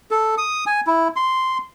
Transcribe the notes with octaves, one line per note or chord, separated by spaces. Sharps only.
A4
D#6
G#5
E4
C6